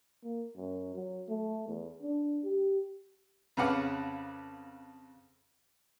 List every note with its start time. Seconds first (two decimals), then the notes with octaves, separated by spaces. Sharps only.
0.24 A#3
0.56 F#2
0.95 F#3
1.29 A3
1.68 E2
2.02 D4
2.44 G4
3.57 F2 C#3 B4 F#5 D6 F6